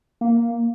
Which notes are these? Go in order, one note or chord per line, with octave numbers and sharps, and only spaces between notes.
A#3